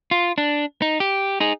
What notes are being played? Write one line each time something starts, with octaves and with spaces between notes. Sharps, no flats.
F4
D4
D#4
G4
D#4 G#4